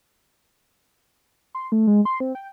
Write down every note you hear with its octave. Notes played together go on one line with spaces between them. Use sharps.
C6
A3
G#3
C6
C4
G5